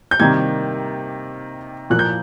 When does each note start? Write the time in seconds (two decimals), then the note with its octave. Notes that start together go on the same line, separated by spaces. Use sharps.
0.11 G6
0.20 C3 D#3 G3 A#3 G#6
1.90 A#2 F3 A#3 F#6
1.99 G6